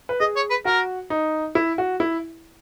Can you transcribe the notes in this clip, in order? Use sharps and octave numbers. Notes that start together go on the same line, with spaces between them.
B4
G#4 D#5
C#5
B4
F#4 A#4
D#4
E4
F#4
E4